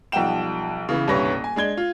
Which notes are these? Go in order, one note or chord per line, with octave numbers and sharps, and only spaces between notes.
B1 F3 G3 F#5 G5 E7
C#3 E3 B3
D#1 C2 G2 C#4 B4 A#6
G#5
G#3 D4 G#6 G7
F4